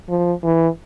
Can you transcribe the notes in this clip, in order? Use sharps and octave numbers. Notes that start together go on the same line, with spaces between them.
F3
E3